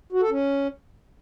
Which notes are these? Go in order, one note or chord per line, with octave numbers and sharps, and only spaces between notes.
F#4
A4
C#4